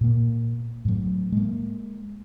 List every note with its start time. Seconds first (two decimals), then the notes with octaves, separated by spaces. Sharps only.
0.01 A#2 A#3
0.85 A2 F#3
1.32 G#3 A#3